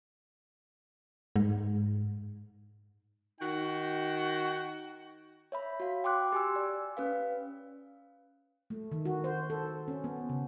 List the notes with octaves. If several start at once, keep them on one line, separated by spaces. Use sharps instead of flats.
G#2
D#3 D#4 F#4 G5
C#5 E5 B5
F#4 F5
G5 C6 D6 F#6
G4 G#5 E6
D5
C#4 B4 F5
A3
D#3
F#4
C5
A4
C#4
B3
C#3